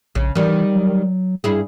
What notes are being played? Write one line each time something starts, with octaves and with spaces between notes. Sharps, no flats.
A#1 C#3
D#3 E3 G3
F#3
G2 E4 G#4